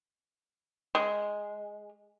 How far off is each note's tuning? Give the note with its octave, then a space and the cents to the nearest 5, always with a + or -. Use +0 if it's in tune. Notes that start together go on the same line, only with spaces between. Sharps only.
G#3 +0